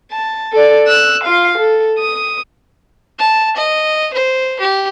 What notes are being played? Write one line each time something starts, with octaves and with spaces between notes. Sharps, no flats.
A5
A4 D5
E6 F#6
F4 F5
A4
D#6
A5
D#5
C5
G4